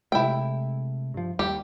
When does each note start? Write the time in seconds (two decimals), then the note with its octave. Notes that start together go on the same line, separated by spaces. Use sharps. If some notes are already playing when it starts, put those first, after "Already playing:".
0.12 C3 G#3 A3 E4 G5
1.14 G2 F3
1.39 D#2 G3 G4